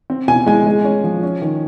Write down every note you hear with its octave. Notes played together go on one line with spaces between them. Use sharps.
C4
B2 G#5
G#3 G#5
G#3
C#4
F3
C#4
D#3